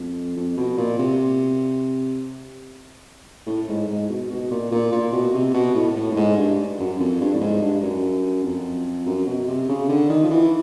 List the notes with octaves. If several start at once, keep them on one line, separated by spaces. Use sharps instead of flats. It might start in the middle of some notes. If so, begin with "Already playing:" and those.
Already playing: F2
F2
B2
A#2
C3
A2
G#2
G#2
B2
B2
A#2
A#2
A#2
B2
C3
B2
A2
A2
A2
G#2
G2
F#2
F2
G2
A2
G#2
G2
F#2
F2
F#2
B2
C3
C#3
D3
D#3
F3
E3